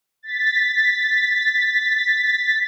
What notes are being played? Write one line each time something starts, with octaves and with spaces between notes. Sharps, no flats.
A6 B6